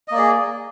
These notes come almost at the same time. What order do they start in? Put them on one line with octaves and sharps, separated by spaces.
D#5 A#3 D5 G#4